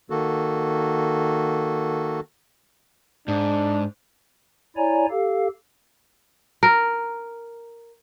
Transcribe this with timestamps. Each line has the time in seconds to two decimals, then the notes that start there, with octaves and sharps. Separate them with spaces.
0.10 D#3 A#3 F#4 A4
3.28 G#2 D4
4.77 E4 C#5 D5 G#5 A#5
5.10 G4 A4 F5
6.63 A#4